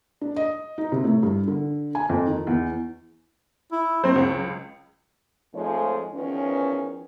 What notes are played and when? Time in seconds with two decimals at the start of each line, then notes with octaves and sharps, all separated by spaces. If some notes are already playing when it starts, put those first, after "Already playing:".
0.21 D4
0.36 D#5
0.78 D#4
0.92 C3
1.04 A2
1.23 G2
1.48 D3
1.95 G#5
2.09 F2
2.27 D#3
2.47 E2
3.72 E4
4.04 F#3 C4 C5
4.16 C#2
5.53 F2 G#2 F3 G#3 A3 C#5
6.13 E2 D#3 F3 C#4